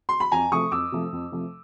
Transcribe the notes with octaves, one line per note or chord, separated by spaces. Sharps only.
C6
B5
F2 G#5 A#5
C3 F3 A3 C#6 D#6
F2 D6 E6
C3 F3 A3
F2
C3 F3 A3